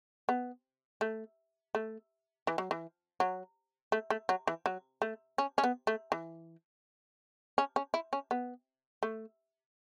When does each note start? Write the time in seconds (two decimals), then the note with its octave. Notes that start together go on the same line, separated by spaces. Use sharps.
0.29 B3
1.01 A3
1.75 A3
2.47 E3
2.58 F#3
2.71 E3
3.20 F#3
3.92 A3
4.10 A3
4.29 F#3
4.48 E3
4.66 F#3
5.02 A3
5.38 C#4
5.58 C#4
5.64 B3
5.87 A3
6.12 E3
7.58 C#4
7.76 C#4
7.94 E4
8.13 C#4
8.31 B3
9.03 A3